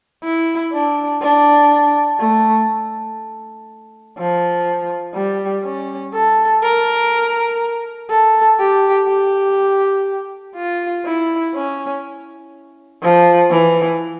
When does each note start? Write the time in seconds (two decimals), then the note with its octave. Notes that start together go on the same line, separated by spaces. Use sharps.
0.24 E4
0.73 D4
1.22 D4
2.20 A3
4.18 F3
5.15 G3
5.64 C#4
6.14 A4
6.63 A#4
8.10 A4
8.59 G4
9.08 G4
10.55 F4
11.06 E4
11.55 C#4
13.02 F3
13.50 E3